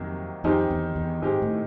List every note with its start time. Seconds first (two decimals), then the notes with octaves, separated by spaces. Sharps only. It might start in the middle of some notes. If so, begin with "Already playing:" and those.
Already playing: F2 C3 D#3 F#3 A#3
0.44 F2 D#3 G#3 C4 D#4 G4
0.70 E2
0.96 E2
1.22 G#2 D#3 G#3 C4 D#4 G4
1.42 A2